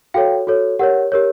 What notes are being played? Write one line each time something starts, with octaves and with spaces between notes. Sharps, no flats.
F#4 A4 C#5 F5 G5
F#4 A4 C#5
G4 A#4 C#5 F#5
G4 A#4 C#5